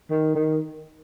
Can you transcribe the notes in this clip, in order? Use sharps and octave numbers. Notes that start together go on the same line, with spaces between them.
D#3
D#3